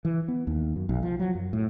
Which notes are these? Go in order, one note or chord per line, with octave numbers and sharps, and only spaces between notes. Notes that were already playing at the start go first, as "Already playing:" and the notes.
E3
B3
D#2
F#2
B1
F3
F#3
F#2
A2